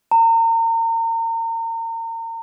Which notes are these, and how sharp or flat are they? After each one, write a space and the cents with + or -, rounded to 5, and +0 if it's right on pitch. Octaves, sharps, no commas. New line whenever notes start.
A#5 -35